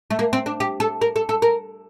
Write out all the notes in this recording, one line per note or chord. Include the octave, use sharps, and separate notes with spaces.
A3
A#3
C4
D4
G4
A4
A#4
A4
A4
A#4